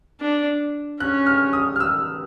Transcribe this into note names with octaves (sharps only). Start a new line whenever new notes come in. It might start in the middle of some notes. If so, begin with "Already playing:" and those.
D4
C#4 F#6
F6
D#6
F6
E6